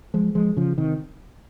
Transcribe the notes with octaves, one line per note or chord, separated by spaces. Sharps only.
F3 G#3
F3 G#3
C#3 F3
C3 D#3